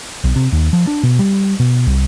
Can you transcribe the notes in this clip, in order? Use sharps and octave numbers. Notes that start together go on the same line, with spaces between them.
B1
C3
D#2
F3
D4
B2
G3
B2
C2